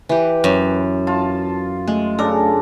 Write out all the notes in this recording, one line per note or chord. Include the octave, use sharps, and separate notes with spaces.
E3 G4 B4
F#2
F4 A5
G#3 A3
C#3 D4 A4 A#4